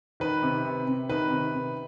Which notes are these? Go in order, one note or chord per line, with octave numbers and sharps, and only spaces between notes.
D#3 B4
C3
C3
C3
D#3 B4
C3
C3